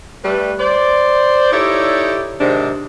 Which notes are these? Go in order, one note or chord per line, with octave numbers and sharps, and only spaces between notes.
G3 A3 B4
C5 D5
D#4 E4 G4 A4 C#5 D5
G#2 C3 D#3 C4 D4